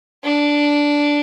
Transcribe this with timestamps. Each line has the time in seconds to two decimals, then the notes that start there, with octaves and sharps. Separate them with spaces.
0.24 D4